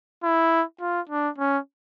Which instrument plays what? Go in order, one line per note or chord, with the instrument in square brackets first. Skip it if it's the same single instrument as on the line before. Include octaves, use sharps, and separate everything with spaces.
[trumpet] E4
F4
D4
C#4